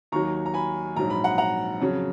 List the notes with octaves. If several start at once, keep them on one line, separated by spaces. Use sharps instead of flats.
D#2 D#3 F#3 A#5 C#6
A#5
G#5 B5
A#1 G#2 F#3 A#5
B5
F#5 A#5
F#5 A#5
F2 C#3 F#3